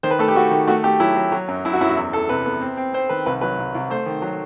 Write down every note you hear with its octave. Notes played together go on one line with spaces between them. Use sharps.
D#3 C5
B4
A3 A4
G4
A3 F#4
D#3
A3 F#4
A3 G4
F#3 E4
F#3
F#3
F#2
F#2 E4
F#4
F#2 E4
F#4
E2
E2 A4
C3 B4
B3
C4
C4
C4 C5
D#3 B4
C2 B4
F#3 B4
C2
C2
A3 C5
D#3
F#3